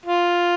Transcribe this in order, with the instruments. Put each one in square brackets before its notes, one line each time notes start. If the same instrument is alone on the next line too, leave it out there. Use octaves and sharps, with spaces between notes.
[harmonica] F4